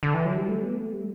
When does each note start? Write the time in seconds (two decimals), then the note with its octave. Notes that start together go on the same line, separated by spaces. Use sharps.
0.03 D3
0.14 E3
0.25 F#3
0.36 G3
0.48 A3
0.63 B3
0.77 A3
0.93 G3